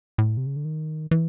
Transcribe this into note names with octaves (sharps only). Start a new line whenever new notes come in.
A2
C3
C#3
D3
D#3
E3